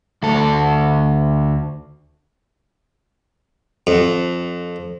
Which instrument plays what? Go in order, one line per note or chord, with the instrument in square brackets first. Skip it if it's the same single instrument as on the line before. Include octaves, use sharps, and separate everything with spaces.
[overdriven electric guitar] D2 A4
[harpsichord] F2